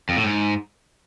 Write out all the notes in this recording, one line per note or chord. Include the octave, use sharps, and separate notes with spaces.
F2
A2
G#2